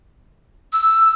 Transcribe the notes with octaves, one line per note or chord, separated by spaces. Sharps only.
E6